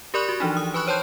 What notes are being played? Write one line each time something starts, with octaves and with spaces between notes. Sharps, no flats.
G4 A#4 D5 B5 C#6 F#6
F#4
E3 F3 D4 D#4
D#6
B4 G#5 B5 C#6 F#6
C5 C#5 G5 A5 C6 G6